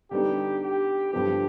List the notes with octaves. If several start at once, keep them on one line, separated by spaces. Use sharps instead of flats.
D3 G3 B3 D#4 G4
G4
G2 D3 F3 B3 G4